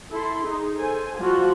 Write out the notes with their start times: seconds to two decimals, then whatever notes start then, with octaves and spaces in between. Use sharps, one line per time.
0.11 E4 A4 C6
0.43 D#4 G#4
0.76 A4 C5 G#5
1.18 F3 G3 F4 F#4